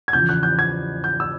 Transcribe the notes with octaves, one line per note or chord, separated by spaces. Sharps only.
G#6
E2 C#3 F3 G6
F#6
G6
G#6
G6
E6